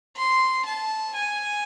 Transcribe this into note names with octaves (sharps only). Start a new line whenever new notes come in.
C6
A5
G#5